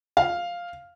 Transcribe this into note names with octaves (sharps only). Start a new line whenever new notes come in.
F5